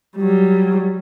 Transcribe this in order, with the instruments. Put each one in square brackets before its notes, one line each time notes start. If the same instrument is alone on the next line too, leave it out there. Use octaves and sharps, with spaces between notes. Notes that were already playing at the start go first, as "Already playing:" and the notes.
[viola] F#3 G3